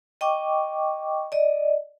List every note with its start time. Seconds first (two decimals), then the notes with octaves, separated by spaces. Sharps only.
0.21 D#5 G5 C#6 D6
1.32 D5 D#5